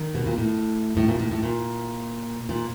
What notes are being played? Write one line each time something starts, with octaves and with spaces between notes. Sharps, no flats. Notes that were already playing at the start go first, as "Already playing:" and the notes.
Already playing: D#3
B2
A#2
A2
A2
A#2
A2
A2
A#2
A#2